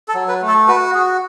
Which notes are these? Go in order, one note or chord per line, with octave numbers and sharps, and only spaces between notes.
A4
F#3
B4
A3
A4
F#4 B4
F#4 G#4